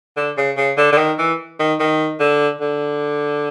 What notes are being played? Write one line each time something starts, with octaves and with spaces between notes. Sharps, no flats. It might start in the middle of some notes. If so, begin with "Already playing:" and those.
D3
C#3
C#3
D3
D3
D#3
E3
D#3
D#3
D3
D3